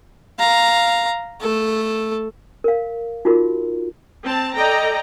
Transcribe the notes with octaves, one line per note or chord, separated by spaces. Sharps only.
F5 A#5
A3 A4
A#4 F5
D#4 F4 F#4 A#4
C4 A5
A4 D5 D#5 G5 A#5